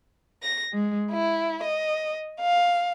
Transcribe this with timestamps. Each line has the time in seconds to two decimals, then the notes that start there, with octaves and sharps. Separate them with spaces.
0.42 A#6
0.73 G#3
1.11 E4
1.64 D#5
2.40 F5